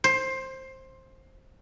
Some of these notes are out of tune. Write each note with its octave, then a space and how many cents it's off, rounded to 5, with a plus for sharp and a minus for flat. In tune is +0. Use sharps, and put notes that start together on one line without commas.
C5 +15